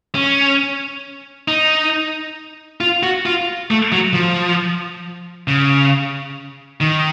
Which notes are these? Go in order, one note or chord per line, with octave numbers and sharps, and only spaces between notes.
C#4
D#4
F4
F#4
F4
A3
F#3
F3
C#3
D#3